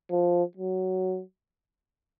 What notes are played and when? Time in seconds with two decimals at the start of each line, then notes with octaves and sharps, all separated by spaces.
0.11 F3
0.57 F#3